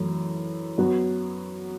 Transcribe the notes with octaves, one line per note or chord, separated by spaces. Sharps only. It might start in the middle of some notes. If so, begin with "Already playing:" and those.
Already playing: F#2 E3 A3
F#2 F#3 B3 F#4